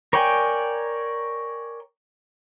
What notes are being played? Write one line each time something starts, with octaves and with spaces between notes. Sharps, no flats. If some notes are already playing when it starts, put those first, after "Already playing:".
A#4 C#5 D5 G5 G#5